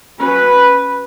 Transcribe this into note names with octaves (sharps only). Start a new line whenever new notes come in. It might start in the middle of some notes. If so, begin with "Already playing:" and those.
F#3 C#4 B4